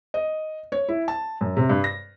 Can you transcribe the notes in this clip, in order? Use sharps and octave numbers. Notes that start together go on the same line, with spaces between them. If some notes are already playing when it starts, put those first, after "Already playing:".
D#5
C#5
E4
A5
F#2
C3
G2
A#6